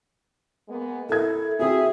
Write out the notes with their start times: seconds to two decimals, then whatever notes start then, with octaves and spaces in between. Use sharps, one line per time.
0.68 G#3 A#3 B3
1.09 E4 A4 A#4 G#6
1.59 C4 F#4 G#4 E5